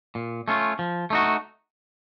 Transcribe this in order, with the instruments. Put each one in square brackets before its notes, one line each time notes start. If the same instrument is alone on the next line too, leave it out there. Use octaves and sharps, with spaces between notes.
[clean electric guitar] A#2
A3 C#4 F4
F3
A3 D#4 F#4